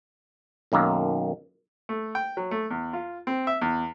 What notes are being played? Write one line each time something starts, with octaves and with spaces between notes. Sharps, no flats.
B1 F#2 D#3 A#3
A3
G5
F#3
A3
E2
F4
C4
E5
E2